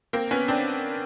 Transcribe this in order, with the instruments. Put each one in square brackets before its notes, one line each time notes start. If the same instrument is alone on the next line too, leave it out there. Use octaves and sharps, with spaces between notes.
[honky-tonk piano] A#3 C4
B3 C#4
C4 D4